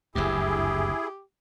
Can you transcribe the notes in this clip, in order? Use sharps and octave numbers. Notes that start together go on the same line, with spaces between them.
F#1 D2 G2 E4 G4 G#4